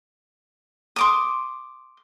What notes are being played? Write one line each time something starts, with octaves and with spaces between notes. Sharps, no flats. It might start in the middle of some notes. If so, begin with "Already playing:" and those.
C6 D6 D#6